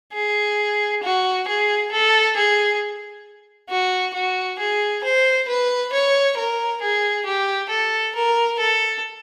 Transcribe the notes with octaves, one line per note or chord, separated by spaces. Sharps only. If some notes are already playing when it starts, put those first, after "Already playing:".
G#4
F#4
G#4
A4
G#4
F#4
F#4
G#4
C5
B4
C#5
A#4
G#4
G4
A4
A#4
A4